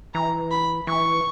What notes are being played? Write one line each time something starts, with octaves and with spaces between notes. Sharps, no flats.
E3 A#5
B5
E3 C#6